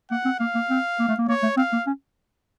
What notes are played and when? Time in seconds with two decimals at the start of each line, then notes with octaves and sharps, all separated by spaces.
0.10 A#3 F#5
0.25 C4
0.40 A#3 F5
0.55 A#3
0.70 C4
0.99 A#3
1.09 A3
1.18 A#3
1.29 A#3 C#5
1.43 A3
1.57 C4 F5
1.73 A#3
1.87 C#4